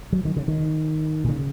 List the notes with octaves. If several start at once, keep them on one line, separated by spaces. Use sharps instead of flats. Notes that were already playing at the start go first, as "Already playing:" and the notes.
F#3
D#3
C#3
D#3
A#2
C#3